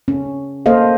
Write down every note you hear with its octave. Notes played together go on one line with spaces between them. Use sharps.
C#4
A#3 A4 C5 D#5 F5